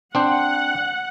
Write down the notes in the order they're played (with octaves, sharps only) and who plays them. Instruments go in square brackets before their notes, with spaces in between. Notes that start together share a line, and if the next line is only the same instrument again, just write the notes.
[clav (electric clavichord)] C4 D4 C5 [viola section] F#5